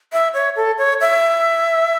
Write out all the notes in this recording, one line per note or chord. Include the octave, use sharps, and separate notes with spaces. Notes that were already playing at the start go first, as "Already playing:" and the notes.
E5
C#5
A4
C#5
E5